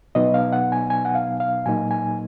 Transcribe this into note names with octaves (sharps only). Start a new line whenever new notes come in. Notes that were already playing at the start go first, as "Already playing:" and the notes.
B2 F#3 B3 D#4 D#5
F5
F#5
G#5
G#5
F#5
F5
F5
A#2 F#3 A#3 D#4 G#5
G#5